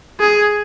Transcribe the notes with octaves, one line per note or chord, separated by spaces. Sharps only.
G#4